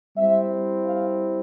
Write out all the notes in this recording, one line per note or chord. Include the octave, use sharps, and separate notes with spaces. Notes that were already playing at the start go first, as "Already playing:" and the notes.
G3 C4 E4 E5
F5